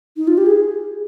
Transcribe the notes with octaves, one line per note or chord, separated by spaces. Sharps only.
D#4
F4
G4
G#4